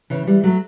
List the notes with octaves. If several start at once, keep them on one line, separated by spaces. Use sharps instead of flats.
C#3 E3
E3 G3
F#3 A3